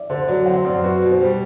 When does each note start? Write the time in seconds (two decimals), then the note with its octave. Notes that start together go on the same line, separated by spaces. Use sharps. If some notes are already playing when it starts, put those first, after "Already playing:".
Already playing: D5 E5
0.10 D3 C5
0.27 F#3 D5
0.46 C4 F#5
0.65 F#2 D5
0.83 F#4 B4
1.02 B2
1.11 C5
1.21 G3